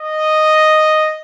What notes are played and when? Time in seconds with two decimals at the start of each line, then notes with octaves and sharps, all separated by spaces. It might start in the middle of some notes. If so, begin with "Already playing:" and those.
Already playing: D#5